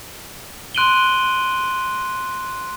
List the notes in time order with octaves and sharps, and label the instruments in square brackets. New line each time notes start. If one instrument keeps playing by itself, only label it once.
[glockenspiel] C6 F#6 D7 D#7 F#7 G7